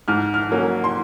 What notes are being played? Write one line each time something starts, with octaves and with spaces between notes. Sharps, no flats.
G#2 F6
F6
F#3 A#3 C#4
C6